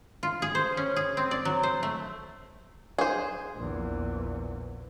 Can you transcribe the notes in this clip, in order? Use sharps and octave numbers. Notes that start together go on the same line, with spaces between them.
F4
G#4
C5
C#4
G#4
C4
D5
F#3
C5
A3
G#4 C5
A#1 E2